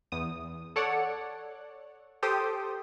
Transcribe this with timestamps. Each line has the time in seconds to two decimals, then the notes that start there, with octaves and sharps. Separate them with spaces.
0.12 E2 D#6
0.76 A4 C#5 D5 F#5
2.23 G4 A4 C5 G5 D#6